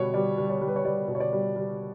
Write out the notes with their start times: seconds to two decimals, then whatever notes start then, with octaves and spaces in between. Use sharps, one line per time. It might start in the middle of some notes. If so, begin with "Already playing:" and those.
Already playing: B2 G3 B4 C#5
0.14 G3 D5
0.38 G3
0.50 C#5
0.61 G3
0.68 B4
0.76 C#5
0.85 G3 D5
1.08 B2
1.15 C#5
1.20 D5
1.33 G3
1.56 G3